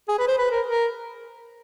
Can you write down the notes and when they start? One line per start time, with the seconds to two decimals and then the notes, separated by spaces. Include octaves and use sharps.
0.09 G#4
0.19 B4
0.28 C5
0.38 B4
0.51 A#4
0.67 A#4